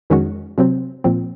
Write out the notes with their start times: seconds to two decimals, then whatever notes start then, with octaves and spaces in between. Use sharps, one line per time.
0.10 F2 D#3 G#3 C#4 F#4
0.58 C3 F#3 C4
1.04 A#2 F3 C4